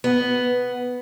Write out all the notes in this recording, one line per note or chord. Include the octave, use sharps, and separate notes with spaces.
B3